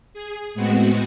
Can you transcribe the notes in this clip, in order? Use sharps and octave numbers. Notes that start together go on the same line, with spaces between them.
G#4
A2 G#3 B3 C4 F#4